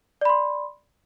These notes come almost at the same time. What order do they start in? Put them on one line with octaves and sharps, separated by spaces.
D5 B5 C6